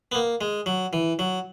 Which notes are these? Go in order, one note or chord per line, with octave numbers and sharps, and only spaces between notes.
B3
A#3
G#3
F#3
E3
F#3